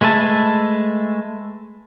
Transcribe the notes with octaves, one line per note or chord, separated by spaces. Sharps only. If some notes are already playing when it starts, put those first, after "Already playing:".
G#3 A3 B4 E5 A5